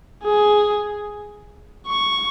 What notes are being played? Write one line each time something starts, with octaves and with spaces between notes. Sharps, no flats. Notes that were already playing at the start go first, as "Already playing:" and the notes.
G#4
C#6